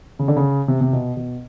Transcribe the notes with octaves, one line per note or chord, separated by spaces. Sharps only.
C#3
D3
C#3
C3
C3
B2
B2